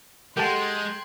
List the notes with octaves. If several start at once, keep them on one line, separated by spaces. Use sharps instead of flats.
G#3 G4 A4 F#5 A5 C6 F#6 G#6